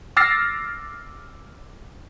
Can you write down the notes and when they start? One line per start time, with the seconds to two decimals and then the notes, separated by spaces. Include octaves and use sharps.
0.17 D6 E6 F6 A6 A#6 C7